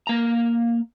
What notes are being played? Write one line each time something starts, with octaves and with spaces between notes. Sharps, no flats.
A#3 A#5